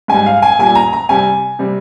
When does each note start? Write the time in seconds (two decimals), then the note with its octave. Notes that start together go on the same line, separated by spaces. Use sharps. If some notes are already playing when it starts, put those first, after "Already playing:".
0.08 G#2 G3 G#5
0.26 F5
0.42 G#5
0.59 A#2 G3 G#5
0.75 A#5
0.93 A#5
1.09 C3 G3 G#5
1.59 C3 G3